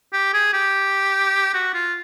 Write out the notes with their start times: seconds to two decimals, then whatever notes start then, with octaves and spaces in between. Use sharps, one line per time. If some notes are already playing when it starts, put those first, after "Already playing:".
0.13 G4
0.34 G#4
0.53 G4
1.54 F#4
1.74 F4